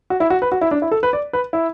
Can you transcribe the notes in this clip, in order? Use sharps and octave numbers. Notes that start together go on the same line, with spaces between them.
F#4
E4
F#4
B4
F#4
E4
D4
E4
A4
B4
D5
B4
E4